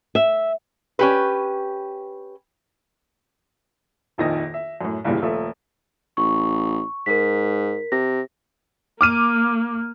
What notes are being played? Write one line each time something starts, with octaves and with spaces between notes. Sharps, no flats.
E5
C#4 G4 B4
D#1 A#1 F2 D#3 D#5 A#6
E5
F#2 A2
C2 G2 A#2 C#3 E3 G3
D#1 F3 A3 E5
A1 C#6
G#2 A#4 B6
C3 A#6
A#3 D6 F6 D#7